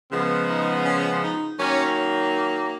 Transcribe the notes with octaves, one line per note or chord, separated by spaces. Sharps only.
C#3 F3 G#3 B3
D#4
C#4
D#4
D#3 F#3 A#3 C#4